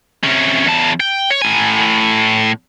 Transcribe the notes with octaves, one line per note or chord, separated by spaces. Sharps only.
C3 C#4
E2 A5
G5
C#5
A2 G#5